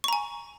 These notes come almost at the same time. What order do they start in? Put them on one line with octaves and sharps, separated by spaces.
C#6 A#5 G#5